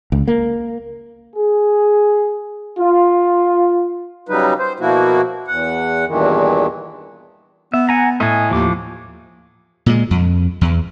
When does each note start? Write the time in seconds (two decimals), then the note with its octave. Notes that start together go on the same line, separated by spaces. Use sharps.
0.12 C#2
0.28 A#3
1.36 G#4
2.77 F4
4.29 C#3 F#3 G3 D#4 B4
4.59 C5
4.80 B2 F3 A#3 E4 F#4
5.48 E2 F#5
6.07 E2 G2 A#2 D#3 E3
7.74 B3 E5
7.89 F#5 G#5 A#5
8.20 A2 D#5 G#5
8.51 D#2 F3 D6
9.86 A#2 G#3
10.11 F2
10.61 E2